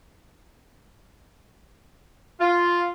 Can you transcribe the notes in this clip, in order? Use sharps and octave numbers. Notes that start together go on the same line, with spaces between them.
F4